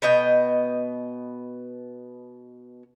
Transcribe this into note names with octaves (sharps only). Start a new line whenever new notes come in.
B2 B3 D#5 G5